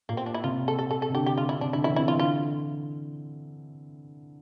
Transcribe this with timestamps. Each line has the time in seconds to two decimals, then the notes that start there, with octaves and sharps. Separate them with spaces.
0.09 A#2 A#3
0.17 C4
0.26 D4
0.34 E4
0.44 C3 F4
0.68 A4
0.79 A4
0.91 A4
1.02 A4
1.10 C3
1.14 D3 G4
1.26 G4
1.38 F4
1.49 E4
1.61 C3 D4
1.73 D3 E4
1.84 E3 E4
1.96 C4 E4
2.08 E3 F4
2.19 D3 F4